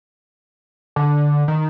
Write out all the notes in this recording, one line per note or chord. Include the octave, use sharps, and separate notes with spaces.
D3
D#3